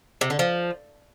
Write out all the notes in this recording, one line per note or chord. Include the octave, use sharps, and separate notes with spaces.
C3
D3
F3